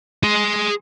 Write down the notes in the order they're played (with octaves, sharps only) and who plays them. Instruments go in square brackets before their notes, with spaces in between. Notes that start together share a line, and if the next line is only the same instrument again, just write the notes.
[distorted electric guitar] G#4 C6